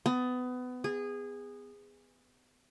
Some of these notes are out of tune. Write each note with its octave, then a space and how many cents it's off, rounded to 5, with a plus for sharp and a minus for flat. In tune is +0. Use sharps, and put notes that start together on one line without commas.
B3 +25
G#4 -20